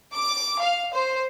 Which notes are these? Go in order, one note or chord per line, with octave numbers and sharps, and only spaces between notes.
D6
F5
C5